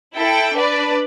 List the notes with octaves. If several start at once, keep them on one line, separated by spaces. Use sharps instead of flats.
E4 A4 G5
D4 B4 D5